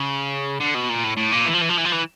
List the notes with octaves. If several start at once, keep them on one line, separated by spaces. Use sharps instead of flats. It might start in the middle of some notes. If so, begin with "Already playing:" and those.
Already playing: C#3
D3
B2
A#2
A2
A2
A#2
E3
F3
E3
F3
E3
F3
E3